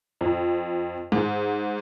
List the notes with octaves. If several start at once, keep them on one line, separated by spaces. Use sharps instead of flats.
F2
G#2